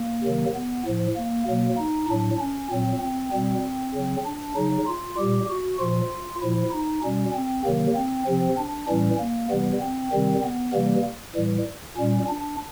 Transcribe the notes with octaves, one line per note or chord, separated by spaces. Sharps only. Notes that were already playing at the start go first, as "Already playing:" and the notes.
Already playing: A#3
C3 D#3 F#3
B3
A2 F3
A#3
B2 F#3 A#3
D#4
A2 F#3 D4
C#4
A#2 F#3 C4
C4
B2 G3 C4
C#3 F#3
D4
C#3 F#3 D#4
F4
A#2 G3 G4
F#4
A#2 F3 F4
A#2 F3 E4
D#4
B2 G3 C#4
C4
C3 D#3 F#3 A#3
C4
C3 F3 C4
D4
A2 E3 G3 C#4
A#3
C3 E3 G3 B3
C4
C3 D#3 G3 C4
B3
C3 E3 G3 A#3
A2 E3 G3
A#2 G3 C#4
D4